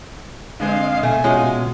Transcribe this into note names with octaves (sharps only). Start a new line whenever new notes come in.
D3 G#3 C4 D#5 F5
B2 A3 G#5
G#3 C#4 F4 F#4